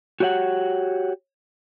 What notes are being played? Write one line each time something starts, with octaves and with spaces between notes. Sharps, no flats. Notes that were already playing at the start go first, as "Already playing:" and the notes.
F#4 G4 C#5 E5 F#5